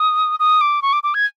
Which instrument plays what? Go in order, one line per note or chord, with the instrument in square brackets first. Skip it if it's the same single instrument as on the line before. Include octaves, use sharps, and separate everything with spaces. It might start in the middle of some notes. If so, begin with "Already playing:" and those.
Already playing: [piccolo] D#6
D#6
D6
C#6
D6
D6
G#6